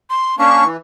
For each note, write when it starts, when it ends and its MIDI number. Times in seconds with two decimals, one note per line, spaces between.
0.10 0.38 84
0.39 0.64 58
0.39 0.64 61
0.39 0.64 62
0.39 0.65 85
0.64 0.77 52